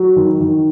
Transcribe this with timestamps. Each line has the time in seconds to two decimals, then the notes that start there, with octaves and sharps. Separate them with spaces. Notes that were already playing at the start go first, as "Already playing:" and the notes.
Already playing: F#3
0.16 D#3
0.40 D#3